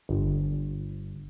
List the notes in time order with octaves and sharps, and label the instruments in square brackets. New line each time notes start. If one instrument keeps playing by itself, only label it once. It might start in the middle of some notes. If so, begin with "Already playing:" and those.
[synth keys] G1